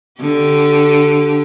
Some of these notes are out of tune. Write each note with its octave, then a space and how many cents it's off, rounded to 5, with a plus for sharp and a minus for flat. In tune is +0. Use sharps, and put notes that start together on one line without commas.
D3 +0 G4 -25